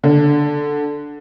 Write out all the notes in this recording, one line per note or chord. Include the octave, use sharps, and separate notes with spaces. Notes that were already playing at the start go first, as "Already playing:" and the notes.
D3